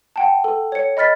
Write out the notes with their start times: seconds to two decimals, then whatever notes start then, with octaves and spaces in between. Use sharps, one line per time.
0.16 F#5 G5 A5
0.44 A4
0.72 C#5 C#7
0.97 D#5 B5 F6 A6 B6